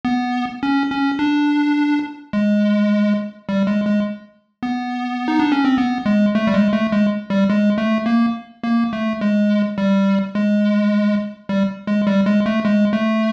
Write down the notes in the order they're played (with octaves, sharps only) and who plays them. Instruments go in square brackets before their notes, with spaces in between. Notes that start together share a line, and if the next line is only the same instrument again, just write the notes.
[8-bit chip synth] B3
C#4
C#4
D4
G#3
G3
G#3
G#3
B3
D#4
D4
C#4
C4
B3
G#3
A3
G3
G#3
A3
G#3
G3
G#3
A3
A#3
A#3
A3
G#3
G3
G#3
G3
G#3
G3
G#3
A3
G#3
A3